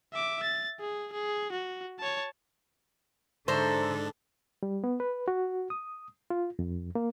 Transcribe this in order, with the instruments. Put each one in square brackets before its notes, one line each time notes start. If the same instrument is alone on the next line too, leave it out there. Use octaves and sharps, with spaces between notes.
[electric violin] E5 D6
A6
G#4
G#4
F#4
C#5 A5
[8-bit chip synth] G#2 D4 [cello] D3 A4 [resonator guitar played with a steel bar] C5 [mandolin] E5 A#5
[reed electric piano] G3
B3
B4
F#4
D#6
F4
F2
A#3